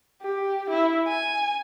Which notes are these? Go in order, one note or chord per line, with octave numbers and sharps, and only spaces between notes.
G4
E4
G#5